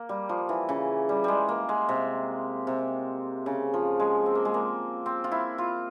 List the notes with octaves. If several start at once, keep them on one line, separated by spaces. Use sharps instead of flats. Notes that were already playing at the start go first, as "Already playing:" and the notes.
Already playing: A#3
G3
F3
E3
C#3
G3
G3 G#3
A#3
G#3
C3
C3
C#3
F3
G#3
C4
A#3
G#3
A#3
C4
F4
E4
F4